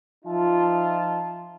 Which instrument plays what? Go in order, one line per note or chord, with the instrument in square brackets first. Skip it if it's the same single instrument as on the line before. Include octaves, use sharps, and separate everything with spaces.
[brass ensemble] F3 D#4 F4 E5 A5